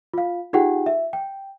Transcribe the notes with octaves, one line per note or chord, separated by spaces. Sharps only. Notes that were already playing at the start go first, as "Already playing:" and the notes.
F4 F5
D#4 F4 G4 G#4 F#5 G5
E5
G5